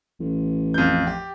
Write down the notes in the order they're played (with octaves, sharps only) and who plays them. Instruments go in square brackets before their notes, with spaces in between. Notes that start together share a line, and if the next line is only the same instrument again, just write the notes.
[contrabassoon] A1
[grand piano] F2 G6
G4